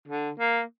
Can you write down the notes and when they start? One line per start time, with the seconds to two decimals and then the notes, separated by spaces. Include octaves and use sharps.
0.08 D3
0.39 A#3